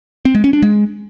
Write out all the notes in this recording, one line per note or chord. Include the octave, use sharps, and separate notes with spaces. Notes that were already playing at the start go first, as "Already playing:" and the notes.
C4
G#3
C#4
D4
G#3